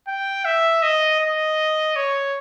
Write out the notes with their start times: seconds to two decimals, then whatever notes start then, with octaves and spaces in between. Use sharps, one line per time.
0.08 G5
0.45 E5
0.82 D#5
1.20 D#5
1.96 C#5